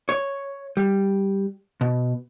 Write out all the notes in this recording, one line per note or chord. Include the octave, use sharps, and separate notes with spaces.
C#5
G3
B2